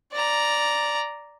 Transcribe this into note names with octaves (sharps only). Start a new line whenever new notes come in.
D5 A#5